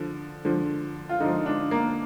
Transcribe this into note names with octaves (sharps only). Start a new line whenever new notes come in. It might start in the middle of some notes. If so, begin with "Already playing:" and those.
Already playing: D3 F3
D3 F3
F4
D3 F3 D#4
D4
A#3